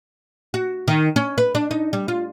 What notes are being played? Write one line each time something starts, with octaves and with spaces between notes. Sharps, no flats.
F#4
D#3
C#4
B4
D4
D#4
G3
F4